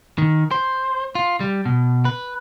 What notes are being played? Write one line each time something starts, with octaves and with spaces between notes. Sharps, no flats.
D#3
C5
F4
G3
B2
B4